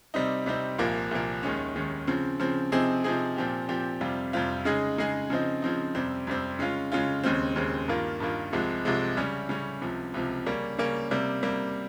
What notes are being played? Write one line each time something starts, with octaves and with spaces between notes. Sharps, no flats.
C3 G3 C4 D#4
C3 G3 C4 D#4
C2 A#2 F3 A#3
C2 A#2 F3 A#3
D#2 D#3 G#3 C#4
D#2 D#3 G#3 C#4
C#3 F3 C4
C#3 F3 C4
C3 F3 C4 D#4 G#4
C3 F3 C4 D#4 G#4
A#2 F3 C4 G4
A#2 F3 C4 G4
F2 C3 G3 C4 F4
F2 C3 G3 C4 F4
C#3 G#3 D#4 G#4
C#3 G#3 D#4 G#4
C#3 F3 C4 D#4
C#3 F3 C4 D#4
F2 C3 G3 C4
F2 C3 G3 C4
C#3 G#3 C#4 F4
C#3 G#3 C#4 F4
D#2 C#3 G#3 C4
D#2 C#3 G#3 C4
G2 D#3 A#3 F4
G2 D#3 A#3 F4
C2 C3 F3 G#3
C2 C3 F3 G#3
C#3 G3 C#4
C#3 G3 C#4
C#2 C3 F3
C#2 C3 F3
C#3 G3 A#3 C#4
C#3 G3 A#3 C#4
C3 G3 A#3
C3 G3 A#3